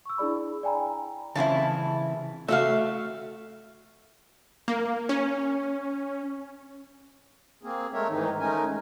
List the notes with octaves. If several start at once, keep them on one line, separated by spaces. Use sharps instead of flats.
C#6 E6
D4 E4 G#4 D5 B5
D5 G5 G#5 A#5 B5
C#3 E3 C4 E4 A5
A3 F#4 E5 F5
A#3
C#4
A#3 C4 G#4
G#3 A3 A#4 C#5 E5
G#2 D#3 E3 D#4
G#3 A3 C#4 D#4 A#4 G#5